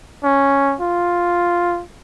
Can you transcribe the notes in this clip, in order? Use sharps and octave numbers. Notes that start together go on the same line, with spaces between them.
C#4
F4